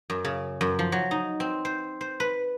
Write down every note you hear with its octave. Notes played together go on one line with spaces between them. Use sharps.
F#2
C#3
F#2
F3
F#3
D#4
C4
C5
C5
B4